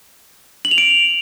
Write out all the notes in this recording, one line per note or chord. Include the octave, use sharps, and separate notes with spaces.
F#7
F7
D7